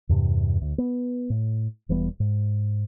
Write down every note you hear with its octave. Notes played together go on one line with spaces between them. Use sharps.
E2 G2 C3
D2
B3
A2
E1 E3 G3 B3
G#2